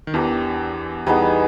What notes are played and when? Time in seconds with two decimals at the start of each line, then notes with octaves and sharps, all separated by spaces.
0.07 D#3
0.14 E2 E3 D4 G4 A#4
1.06 E2 E3 G3 B3 D#4 G#4